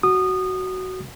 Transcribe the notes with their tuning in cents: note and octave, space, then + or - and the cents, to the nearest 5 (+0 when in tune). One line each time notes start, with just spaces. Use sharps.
F#4 +10 D#6 -20